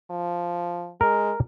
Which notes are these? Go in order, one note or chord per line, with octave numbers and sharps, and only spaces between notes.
F3
G#3 A#4